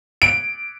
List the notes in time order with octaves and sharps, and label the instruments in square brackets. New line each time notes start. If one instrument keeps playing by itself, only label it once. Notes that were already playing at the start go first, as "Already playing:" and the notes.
[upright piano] D7